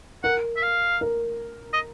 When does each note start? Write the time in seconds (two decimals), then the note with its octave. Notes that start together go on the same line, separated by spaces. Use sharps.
0.24 A#4 F#5
0.57 E5
0.63 F5
1.01 A#4
1.74 D#5